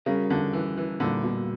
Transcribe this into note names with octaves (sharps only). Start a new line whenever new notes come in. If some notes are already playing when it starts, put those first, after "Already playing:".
C#3 G3 C#4 F#4 A#4
D3
E3
E3
A#2 D3 G3 A#3
B2